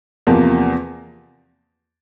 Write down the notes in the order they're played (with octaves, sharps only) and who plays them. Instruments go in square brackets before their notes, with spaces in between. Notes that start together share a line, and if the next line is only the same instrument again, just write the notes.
[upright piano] E2 C3 F3 A#3